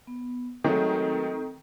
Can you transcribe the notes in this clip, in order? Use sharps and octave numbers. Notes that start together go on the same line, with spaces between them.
B3
D#3 F#3 G#3 A3 C4 A4